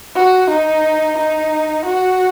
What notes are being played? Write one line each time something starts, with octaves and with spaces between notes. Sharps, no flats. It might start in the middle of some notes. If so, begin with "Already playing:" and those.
F#4
D#4
D#4
F#4